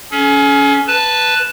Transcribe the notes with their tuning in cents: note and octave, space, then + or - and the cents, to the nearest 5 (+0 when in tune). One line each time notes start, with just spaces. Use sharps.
C#4 +20 A4 -45
B4 +0 A5 +0